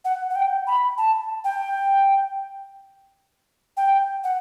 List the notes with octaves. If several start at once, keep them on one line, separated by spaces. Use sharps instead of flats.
F#5
F#5
G5
B5
A5
G5
G5
F#5